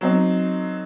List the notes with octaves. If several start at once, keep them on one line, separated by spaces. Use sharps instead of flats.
F#3 C4 D#4